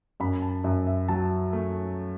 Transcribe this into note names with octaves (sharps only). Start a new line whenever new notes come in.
F#2 B5
A5
F#2 E5
E5
F#3 A5
A3